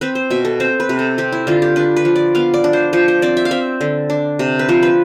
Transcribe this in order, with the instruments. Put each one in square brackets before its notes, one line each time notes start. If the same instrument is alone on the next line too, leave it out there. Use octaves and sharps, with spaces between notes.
[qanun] C4 B4
C5
B2 E5
A4
C4 C5
B4
C3
A4
C4 G4
E4
D3 F4
G4
D4 B4
B4
F3
D5
B3 F5
D5
D4
C5
F3 C5
C5
C4 D5
E5
F5
C4 E5
D3
D4
C3
B4
F3 C5
B4